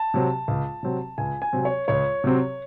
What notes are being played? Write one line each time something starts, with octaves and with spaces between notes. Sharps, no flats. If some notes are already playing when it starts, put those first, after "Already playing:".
Already playing: A5
C3 F#3 C4
C#2
C3 F#3 C4
C#2 G#5
G#5
C3 F#3 C4
C#5
C#2 C#5
C3 F#3 C4